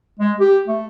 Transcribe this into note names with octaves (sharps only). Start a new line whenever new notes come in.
G#3
G4
A3